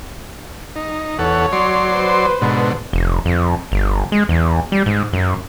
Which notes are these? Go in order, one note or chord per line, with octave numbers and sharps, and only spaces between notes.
D#4
E2 A4 C#5 F#5
F#3 D5 C6
B4 C5
G#2 B2 D3
F1
F2
G1
G#3
E2
G3
G#2
F#2